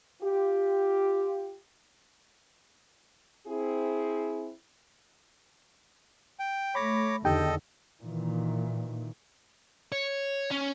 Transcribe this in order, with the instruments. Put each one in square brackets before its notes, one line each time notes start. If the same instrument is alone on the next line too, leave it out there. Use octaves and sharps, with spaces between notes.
[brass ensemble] F4 G4
[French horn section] C4 E4 G#4
[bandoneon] G5
[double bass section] A3 [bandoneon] C#5 D6 [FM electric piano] B5 A#6
[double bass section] E2 D3 D#3 [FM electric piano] D#4 G4 G5 [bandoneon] A4 D#5
[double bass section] A#2 D#3 E3
[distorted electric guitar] C#5
C#4